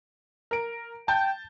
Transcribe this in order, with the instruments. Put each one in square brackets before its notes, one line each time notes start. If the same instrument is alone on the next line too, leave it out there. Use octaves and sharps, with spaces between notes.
[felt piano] A#4 D7
[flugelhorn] G5 [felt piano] A5 G6